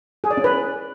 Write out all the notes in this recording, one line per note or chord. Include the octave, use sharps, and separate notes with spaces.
G#4
D5
C#4
B4